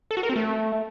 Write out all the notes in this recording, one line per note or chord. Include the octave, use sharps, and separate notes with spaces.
A4
F#4
A#4
C4
A3